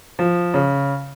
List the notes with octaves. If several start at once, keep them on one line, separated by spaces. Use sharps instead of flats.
F3
C#3